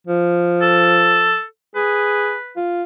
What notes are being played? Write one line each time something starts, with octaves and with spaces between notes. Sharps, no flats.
F3
A4
G#4 B4
F4